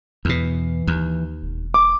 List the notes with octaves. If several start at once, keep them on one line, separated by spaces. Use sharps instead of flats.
E2 B2 E3
D#2
E1
D6